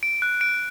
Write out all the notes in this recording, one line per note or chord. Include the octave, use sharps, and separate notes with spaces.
D7
F#6
D7